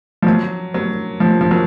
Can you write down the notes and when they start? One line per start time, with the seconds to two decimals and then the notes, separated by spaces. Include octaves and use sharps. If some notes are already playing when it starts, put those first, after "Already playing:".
0.22 F3
0.26 F#3
0.74 F#3
1.20 F3
1.41 F3
1.51 F#3